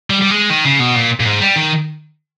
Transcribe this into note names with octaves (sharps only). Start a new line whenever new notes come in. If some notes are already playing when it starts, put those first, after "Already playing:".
G3
G3
G#3
D#3
C#3
B2
A#2
A#2
G#2
G3
D#3